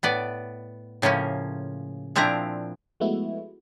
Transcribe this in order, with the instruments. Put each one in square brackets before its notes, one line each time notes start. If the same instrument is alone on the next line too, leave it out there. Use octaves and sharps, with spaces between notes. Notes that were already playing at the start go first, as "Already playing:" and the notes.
[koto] A2 B3 D5
A2 C#3 F3 A#3 C#4
A#2 F3 C4 D4 E4 A#5
[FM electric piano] F3 G#3 A3 B3 E4 F#4